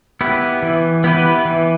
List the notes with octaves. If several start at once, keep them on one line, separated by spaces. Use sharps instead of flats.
B3 E4 G4 B4
E3
B3 E4 G4 B4
E3